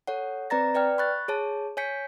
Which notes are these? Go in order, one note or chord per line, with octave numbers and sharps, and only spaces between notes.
A4 C#5 F#5
C4 B4 D5 A#5 A6 A#6
B4 D5 G5 F6
B5 C#6 F#6 A6
G#4 C#5 A5
C#5 G#5 G6 B6 C#7